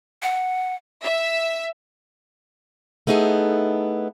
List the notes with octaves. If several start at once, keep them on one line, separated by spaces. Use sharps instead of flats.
F#5
E5
A3 B3 D#4 E4 G#4 A4